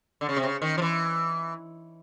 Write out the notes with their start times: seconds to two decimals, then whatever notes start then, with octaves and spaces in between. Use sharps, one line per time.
0.21 D3
0.29 C#3
0.37 C3
0.44 C#3
0.62 D#3
0.78 F3
0.82 E3